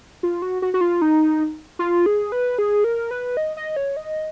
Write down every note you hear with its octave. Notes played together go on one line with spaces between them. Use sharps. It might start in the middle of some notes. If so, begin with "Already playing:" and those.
F4
F#4
F#4
F#4
F4
D#4
F4
G#4
B4
G#4
A#4
B4
D#5
D#5
C#5
D#5